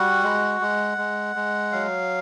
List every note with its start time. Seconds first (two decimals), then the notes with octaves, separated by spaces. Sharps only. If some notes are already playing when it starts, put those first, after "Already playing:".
Already playing: G3 F#4 F#5
0.23 G#3
0.61 G#3
0.98 G#3
1.36 G#3
1.72 F#3 F5